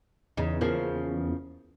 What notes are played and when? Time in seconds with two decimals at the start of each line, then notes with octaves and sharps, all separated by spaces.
0.37 E2 C#3 D#4
0.61 C#3 F3 A#3